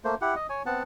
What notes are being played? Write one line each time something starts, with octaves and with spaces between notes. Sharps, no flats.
A3 A#3 C5
E4 G4 F#5
D#5
C#5 G#5
B3 C4 F#5 A5